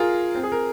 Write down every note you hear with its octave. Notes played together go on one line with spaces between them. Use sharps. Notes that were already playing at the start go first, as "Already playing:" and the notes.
Already playing: F4 G#4 A#4
C4
G#4
A#4